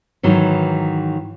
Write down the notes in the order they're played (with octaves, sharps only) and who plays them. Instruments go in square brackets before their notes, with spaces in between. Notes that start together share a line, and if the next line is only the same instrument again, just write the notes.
[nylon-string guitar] G#2 D#3 E3 F#3